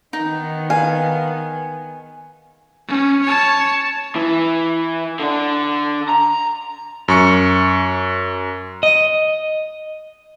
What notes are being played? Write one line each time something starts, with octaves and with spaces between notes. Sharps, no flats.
D#3 B3 D#4
F5 G#5
C#4
C#5 A5
E3
D3 D4
A#5
F#2 C#6 C#7
D#5